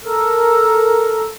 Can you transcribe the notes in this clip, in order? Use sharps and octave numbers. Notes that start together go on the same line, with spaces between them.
A4 A#4